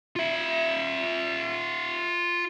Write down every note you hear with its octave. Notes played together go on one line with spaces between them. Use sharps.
F4 E5